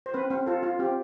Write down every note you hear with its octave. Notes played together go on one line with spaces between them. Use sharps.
C5
C4 B4
C4
F4 A4
F4
C4 G4